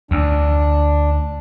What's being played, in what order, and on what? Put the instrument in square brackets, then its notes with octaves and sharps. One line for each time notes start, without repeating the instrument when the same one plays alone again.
[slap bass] D2 [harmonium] D4